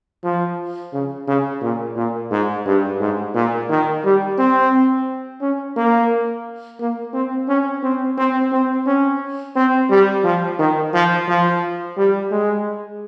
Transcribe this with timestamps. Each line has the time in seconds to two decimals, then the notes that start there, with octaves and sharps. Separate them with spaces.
0.24 F3
0.93 C#3
1.27 C#3
1.62 A#2
1.96 A#2
2.31 G#2
2.65 G2
3.00 G#2
3.34 A#2
3.69 D#3
4.04 G3
4.38 C4
5.41 C#4
5.76 A#3
6.80 A#3
7.13 C4
7.48 C#4
7.83 C4
8.17 C4
8.52 C4
8.87 C#4
9.56 C4
9.90 G3
10.24 F3
10.59 D#3
10.94 F3
11.28 F3
11.97 G3
12.31 G#3